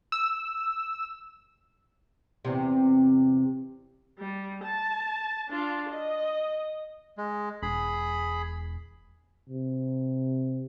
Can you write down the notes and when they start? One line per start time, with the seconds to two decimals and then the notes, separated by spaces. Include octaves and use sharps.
0.12 E6
2.45 E2 C3
4.19 G3
4.63 A5
5.49 D4 F4
5.90 D#5
7.17 G#3
7.62 E1 G#4 B5
9.50 C3